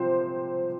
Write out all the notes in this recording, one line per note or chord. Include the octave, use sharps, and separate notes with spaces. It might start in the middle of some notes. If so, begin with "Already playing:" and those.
Already playing: C3 F3 C5